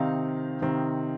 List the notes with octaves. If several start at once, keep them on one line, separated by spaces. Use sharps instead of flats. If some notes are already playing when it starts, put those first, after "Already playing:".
Already playing: C3 D#3 C4 D#4 F5
C3 D#3 C4 D#4